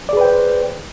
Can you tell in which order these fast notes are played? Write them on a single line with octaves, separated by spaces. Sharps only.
D5 G#4 B4 G5 C5